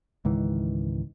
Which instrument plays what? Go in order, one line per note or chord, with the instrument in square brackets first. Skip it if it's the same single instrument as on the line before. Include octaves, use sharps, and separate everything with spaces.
[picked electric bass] C#2 G#2 D#3 E3